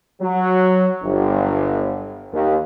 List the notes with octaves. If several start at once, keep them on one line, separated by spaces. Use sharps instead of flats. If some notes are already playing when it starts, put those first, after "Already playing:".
F#3
G1
D#2